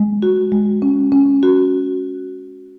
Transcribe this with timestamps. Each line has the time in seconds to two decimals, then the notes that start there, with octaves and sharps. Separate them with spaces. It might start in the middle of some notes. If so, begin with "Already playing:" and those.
Already playing: G#3
0.22 F#4
0.52 G#3
0.82 C#4
1.12 C#4
1.43 F#4